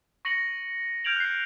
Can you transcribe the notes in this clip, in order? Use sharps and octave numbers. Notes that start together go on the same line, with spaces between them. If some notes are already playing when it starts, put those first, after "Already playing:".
C#6 A#6 C#7 F#7
F6 G6 G#6 D7 F7 F#7
F#6 C7